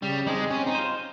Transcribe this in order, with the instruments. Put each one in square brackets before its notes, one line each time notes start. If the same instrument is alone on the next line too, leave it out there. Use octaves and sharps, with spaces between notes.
[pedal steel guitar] C#3 [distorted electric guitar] G3
[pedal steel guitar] G3 C4 D#4 G#4 [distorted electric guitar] G#3
[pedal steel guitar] C4 [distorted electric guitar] C#4
[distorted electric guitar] D#4
[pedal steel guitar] F4 C5